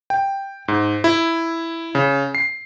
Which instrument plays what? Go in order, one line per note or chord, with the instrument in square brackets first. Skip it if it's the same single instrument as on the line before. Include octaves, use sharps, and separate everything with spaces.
[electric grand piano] G5
G#2
E4
C#3
C7